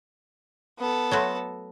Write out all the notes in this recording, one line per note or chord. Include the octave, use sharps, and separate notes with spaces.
B3 A4
F#3 A3 F#4 C#5 B5 C6